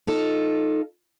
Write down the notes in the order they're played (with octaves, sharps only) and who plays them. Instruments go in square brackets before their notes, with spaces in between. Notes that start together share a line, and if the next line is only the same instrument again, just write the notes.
[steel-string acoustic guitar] D#4 F4 A4